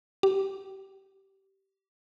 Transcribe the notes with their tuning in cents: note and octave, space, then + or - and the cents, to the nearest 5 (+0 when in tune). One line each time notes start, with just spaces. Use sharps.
G4 -20